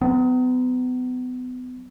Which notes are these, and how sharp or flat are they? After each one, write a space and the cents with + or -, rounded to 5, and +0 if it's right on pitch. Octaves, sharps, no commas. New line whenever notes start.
F#3 +0 B3 +35